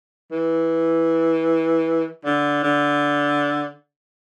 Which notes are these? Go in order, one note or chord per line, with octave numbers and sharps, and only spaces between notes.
E3
D3
D3